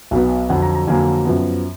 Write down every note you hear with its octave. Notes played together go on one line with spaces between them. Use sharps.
B1 B2 F#3 B3
F2 D3 F#3 F#5
A#5
A#5
F2 D3 F#3 A#3 G#5
F#2 F3 B3